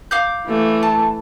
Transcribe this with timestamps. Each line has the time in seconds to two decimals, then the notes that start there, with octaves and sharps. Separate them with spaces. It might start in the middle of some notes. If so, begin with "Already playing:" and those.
0.11 F5 D6 G6
0.47 E3 A3
0.83 A5